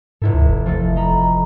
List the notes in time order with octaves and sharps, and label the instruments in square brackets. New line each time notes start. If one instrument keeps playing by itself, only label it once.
[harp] F1 E4 A4 [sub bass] G#2
[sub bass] D2
F#1
[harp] F3 A3 A4
D#5 A#5 B5